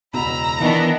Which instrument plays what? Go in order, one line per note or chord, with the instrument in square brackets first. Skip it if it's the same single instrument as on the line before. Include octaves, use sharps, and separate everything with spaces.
[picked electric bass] E1 C#2 B2 [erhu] A#5 [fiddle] B5 E6
[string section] D#3 B3 D4 [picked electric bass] E3 [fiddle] D#4 E5